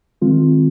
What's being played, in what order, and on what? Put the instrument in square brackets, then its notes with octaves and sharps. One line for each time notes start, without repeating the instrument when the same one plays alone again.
[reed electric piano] D#3 G#3 C4 F4